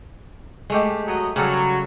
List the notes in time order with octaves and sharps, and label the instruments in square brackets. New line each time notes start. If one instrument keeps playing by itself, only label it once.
[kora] G#3 A3 G4
[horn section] F#3 D#5
[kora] C#3 G3 A4 [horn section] F#3